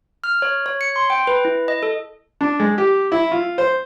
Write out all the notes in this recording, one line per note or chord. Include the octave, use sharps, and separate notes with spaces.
F6
C#5
C#5
C#7
C6
G5
B4
E4
D#5
A4
D4
G#3
G4
E4
F4
C5